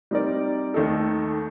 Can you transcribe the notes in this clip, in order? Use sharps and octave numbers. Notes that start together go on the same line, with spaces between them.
G3 C4 D#4 A#4 D5
D#2 D#3 A3 D#4 A4